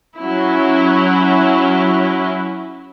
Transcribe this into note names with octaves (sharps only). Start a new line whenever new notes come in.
F#3 C#4 E4